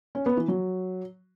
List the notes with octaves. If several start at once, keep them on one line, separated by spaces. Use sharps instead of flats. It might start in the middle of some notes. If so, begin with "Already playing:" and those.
C#4
B3
E3
F#3